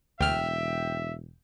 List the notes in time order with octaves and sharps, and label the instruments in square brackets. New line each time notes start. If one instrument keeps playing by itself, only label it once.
[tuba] E1 [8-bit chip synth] D2 F6 [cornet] E5 [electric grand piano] G5